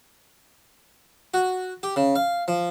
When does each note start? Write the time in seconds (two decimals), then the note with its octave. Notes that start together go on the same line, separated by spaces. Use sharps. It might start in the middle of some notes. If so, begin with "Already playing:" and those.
1.34 F#4
1.83 G4
1.96 C#3
2.16 F5
2.48 F3